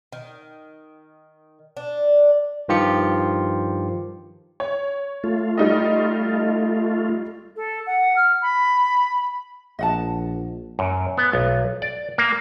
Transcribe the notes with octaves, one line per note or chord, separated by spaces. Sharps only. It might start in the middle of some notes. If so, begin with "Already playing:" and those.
D#3
D4
G2 D#3 F3 F4 G4 C#7
C#5
A3 F4
G3 D#4 D#5
A4
F#5
F6
B5
A#1 D#5 F#5 A5
F#2
B3
B1
D5
A#3